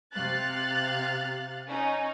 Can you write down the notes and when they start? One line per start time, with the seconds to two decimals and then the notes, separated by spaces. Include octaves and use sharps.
0.12 C3 F5 F#6 A6
1.67 C#4 D#4